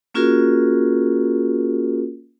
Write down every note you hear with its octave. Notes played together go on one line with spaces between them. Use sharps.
A#3 C#4 F4 F#4 G#4 A#4